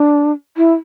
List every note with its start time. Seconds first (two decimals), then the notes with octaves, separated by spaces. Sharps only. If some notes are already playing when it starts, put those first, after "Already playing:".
Already playing: D4
0.57 E4